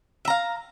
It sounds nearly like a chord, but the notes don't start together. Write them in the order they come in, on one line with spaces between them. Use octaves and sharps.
E5 A#5 F5